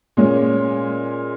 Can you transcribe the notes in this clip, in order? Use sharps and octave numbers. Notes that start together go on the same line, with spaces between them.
A#2 G#3 C#4